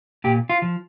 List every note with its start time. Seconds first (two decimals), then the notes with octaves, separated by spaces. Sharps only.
0.24 A#2 G4
0.50 F4
0.62 F3